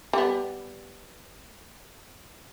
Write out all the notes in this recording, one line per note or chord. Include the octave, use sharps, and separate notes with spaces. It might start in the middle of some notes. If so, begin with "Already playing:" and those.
G3 B3